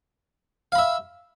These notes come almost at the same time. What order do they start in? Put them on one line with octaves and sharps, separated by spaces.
F5 B5 E5